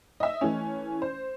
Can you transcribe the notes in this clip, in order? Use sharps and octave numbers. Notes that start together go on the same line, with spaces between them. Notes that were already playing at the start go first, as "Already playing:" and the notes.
D#5 E5
E3 A3 C#4
C5